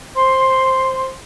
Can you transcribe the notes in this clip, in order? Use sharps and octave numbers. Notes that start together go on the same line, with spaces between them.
C5 C6